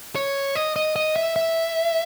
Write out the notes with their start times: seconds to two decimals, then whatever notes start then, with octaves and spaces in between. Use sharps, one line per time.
0.16 C#5
0.56 D#5
0.76 D#5
0.96 D#5
1.16 E5
1.36 E5